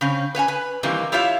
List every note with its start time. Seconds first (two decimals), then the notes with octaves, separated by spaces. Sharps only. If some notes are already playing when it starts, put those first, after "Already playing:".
0.01 C#3 C4 C#4
0.35 B4 C#5 F#5 G#5
0.48 B4
0.83 D#3 E3 G3 A#3 C4
1.12 E4 F4 G4 C#5 E5 F5